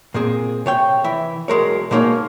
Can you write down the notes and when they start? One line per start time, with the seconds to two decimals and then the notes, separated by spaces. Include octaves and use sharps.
0.14 A#2 A#3 C4 G#4
0.66 C3 C#5 G5
1.04 E3 E5
1.48 B1 G#3 A#4 C#5
1.91 B2 G#3 A#3 D#4 C#5